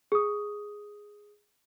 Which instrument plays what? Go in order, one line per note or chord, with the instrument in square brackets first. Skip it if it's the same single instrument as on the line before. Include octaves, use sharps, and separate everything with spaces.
[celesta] G#4 D#6